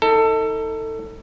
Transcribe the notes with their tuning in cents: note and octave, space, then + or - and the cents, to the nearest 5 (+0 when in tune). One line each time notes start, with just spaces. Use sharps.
D#4 +30 A4 +25